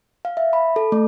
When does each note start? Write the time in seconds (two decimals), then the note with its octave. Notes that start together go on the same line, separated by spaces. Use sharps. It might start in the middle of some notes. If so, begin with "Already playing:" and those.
0.25 F5
0.37 E5
0.53 B5
0.76 A4
0.92 A3